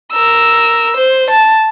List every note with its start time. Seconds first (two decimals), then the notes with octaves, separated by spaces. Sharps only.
0.13 A#4 E6
0.96 C5
1.30 A5